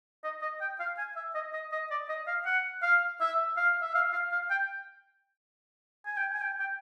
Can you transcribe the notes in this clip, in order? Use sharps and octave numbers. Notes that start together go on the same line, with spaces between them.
D#5
D#5
G5
F5
G#5
E5
D#5
D#5
D#5
D5
D#5
F5
F#5
F5
E5
F5
E5
F5
F5
F5
G5
G#5
G5
G#5
G5
G5